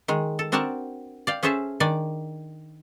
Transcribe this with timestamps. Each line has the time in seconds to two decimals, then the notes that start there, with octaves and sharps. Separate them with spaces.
0.08 D#3 G#3
0.39 A4
0.52 C4 D4 F#4 A#4 D5 A5
1.27 D5 F5 G5
1.43 C#4 G#4 A4 C5 E5 A5
1.80 D#3 D4 D5 G#5